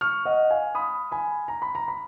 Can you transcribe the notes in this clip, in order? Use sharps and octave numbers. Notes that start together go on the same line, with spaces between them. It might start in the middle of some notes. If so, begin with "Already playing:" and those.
C#6 F6
D#5 F#5
F5 G#5
B5 D#6
G#5 B5
A#5
B5
A#5
B5